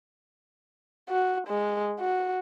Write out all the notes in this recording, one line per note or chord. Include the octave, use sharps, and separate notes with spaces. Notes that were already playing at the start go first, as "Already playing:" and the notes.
F#4
G#3
F#4